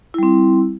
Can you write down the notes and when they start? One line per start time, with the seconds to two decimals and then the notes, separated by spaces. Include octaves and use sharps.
0.14 E4
0.18 G3
0.23 C4